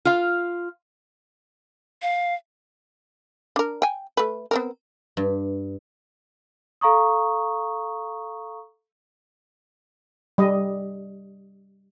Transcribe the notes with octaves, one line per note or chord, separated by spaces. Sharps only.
F4 F5
F5
D4 A#4
G5 G#5
A3 B4
B3 C4 A#4
G2
A4 F5 A#5 C#6 D#6
G3 D#5